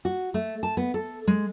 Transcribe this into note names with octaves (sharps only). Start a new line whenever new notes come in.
F#4
A3
A5
B3
A4
G#3